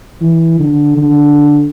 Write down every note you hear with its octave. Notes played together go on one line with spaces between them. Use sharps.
E3
D3
D3